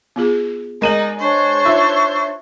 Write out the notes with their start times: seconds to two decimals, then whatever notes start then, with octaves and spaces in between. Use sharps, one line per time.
0.16 B3 F4 G#4
0.82 G#3 D#4 A#4 D5 D#7 F#7
1.19 D4 C5 C#5 C#6
1.65 D#4 F4 E5